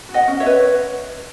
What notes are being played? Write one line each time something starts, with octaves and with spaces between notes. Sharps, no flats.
F#4
D#5 F#5
C#4
C#5 E5
B4